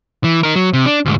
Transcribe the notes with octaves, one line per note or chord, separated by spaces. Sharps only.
E3
D#4 A#4
F#3
C3
D4
D2 G#2